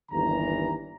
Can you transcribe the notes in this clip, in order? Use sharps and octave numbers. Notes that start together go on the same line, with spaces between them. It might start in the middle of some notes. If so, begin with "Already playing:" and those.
G1 D#2 D3 E3 A#5